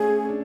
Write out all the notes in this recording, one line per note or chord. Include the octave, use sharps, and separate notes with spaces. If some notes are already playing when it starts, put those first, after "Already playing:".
Already playing: A3 C#4 G#4
C#4
D4